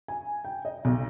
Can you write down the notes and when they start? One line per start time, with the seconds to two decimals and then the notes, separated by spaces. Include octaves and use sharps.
0.08 G#5
0.45 G5
0.65 D#5
0.85 B1